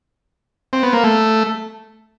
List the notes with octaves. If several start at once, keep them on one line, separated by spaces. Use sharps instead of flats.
C4
B3
A#3
A3